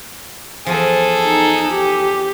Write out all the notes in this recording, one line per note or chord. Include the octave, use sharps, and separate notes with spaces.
E2 F3 G#4 A4
D#4
G4